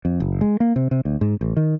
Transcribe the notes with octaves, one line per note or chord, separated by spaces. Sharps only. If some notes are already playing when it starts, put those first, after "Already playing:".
F2
F#1
G#3
A#3
C3
C3
D2
G#2
A1
D#3